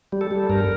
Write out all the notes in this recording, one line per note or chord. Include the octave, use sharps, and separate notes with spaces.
G3
A4
G3
G2 A#4